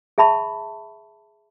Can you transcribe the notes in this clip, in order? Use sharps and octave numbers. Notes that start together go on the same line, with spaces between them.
G#4 E5 A5 B5 C#6